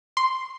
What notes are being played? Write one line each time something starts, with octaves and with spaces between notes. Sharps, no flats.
C6